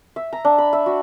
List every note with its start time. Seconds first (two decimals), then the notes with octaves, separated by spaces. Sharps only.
0.16 E5
0.33 A#5
0.45 D4
0.58 B5
0.73 E5
0.86 F#4